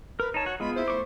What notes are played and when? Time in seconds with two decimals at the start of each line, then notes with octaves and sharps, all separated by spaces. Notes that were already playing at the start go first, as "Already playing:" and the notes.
0.20 A#4 B4
0.34 D#4 C#5 A5
0.46 F#4
0.60 G#3 B3 F4 G#4 B5
0.76 E4 C5
0.88 A3 C#6 D6